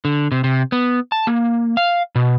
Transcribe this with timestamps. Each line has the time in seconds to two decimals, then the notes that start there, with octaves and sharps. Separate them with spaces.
0.05 D3
0.32 C3
0.44 C3
0.72 B3
1.12 A5
1.27 A#3
1.77 F5
2.15 B2